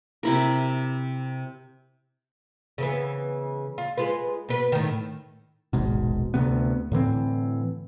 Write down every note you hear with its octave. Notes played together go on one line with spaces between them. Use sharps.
C3 E4 A#4
C#3 E3 B3
F4
G#3 F4 B4
B2 B4
A2 D#3
D#1 G#1 G#2 B2
D2 C3 B3
A2 D3 E3 C4